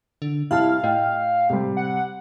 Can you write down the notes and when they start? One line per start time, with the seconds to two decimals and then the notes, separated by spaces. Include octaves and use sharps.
0.22 D3
0.51 C2 E4 F5 A5 F6
0.84 A2 D#5 G5
1.50 C3 G3
1.77 F#5